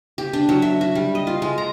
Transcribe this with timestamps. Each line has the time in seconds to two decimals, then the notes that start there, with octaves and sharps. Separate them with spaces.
0.18 G4
0.33 D4
0.49 F#3
0.62 E5
0.81 F#4
0.95 G3
1.15 D#5
1.27 F4
1.42 G#3
1.58 A#5